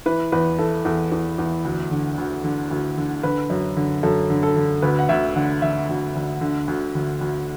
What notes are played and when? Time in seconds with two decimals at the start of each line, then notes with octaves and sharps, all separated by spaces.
0.06 E3 B4
0.32 E2 B4
0.59 E3 A4
0.85 E2 A4
1.12 E2
1.38 E2
1.65 D2
1.91 D3
2.18 D2
2.44 D3
2.71 D2
2.98 D3
3.23 D3 B4
3.50 F#2
3.77 D3
4.03 F#2 A4
4.30 D3
4.43 A4
4.56 D3
4.82 D2 B4
4.99 F#5
5.09 D2 E5
5.36 D3 F#5
5.62 D3 E5
5.89 D2
6.15 D2
6.41 D3
6.68 D2
6.95 D2
7.21 D2